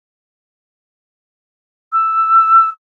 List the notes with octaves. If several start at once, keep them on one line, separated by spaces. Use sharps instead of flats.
E6